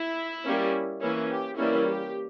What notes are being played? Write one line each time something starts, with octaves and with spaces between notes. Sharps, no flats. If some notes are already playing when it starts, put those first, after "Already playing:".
Already playing: E4
G3 A#3 C#4
E3 A#3 C#4 E4
G4
E3 G3 A#3 C#4 E4
G4